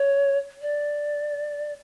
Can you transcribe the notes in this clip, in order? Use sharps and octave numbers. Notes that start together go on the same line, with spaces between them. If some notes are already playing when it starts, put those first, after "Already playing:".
Already playing: C#5
D5